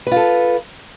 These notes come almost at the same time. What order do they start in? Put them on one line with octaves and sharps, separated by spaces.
B4 F4 A4